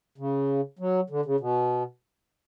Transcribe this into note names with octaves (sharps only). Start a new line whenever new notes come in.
C#3
F#3
D3
C#3
B2